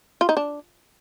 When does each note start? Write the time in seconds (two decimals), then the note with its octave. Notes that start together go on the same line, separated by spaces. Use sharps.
0.21 F4
0.29 D#4
0.37 D4